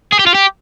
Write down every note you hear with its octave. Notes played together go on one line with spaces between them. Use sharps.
G#4
G4
F4
G4